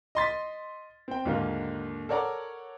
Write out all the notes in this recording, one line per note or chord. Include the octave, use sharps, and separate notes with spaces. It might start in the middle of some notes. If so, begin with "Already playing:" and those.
D#5 C6 A6 B6
C4 G5
D#2 G#2 D3 F4 A#4
A4 A#4 C#5 D5 F#5 A#5